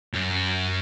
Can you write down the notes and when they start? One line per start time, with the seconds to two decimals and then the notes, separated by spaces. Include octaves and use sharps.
0.13 F#2